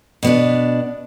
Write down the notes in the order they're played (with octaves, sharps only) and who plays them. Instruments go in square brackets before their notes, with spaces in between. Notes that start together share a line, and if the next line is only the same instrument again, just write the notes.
[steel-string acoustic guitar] B2 B3 D4